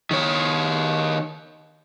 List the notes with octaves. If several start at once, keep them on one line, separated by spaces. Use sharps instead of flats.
D#3 C#5